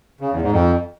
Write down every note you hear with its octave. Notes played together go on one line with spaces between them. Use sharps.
C#3
E2
G#2
F2